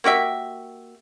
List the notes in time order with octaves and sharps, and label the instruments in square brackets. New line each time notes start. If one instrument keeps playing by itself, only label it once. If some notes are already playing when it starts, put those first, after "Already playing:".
[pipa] A#3 F#4 G4 E5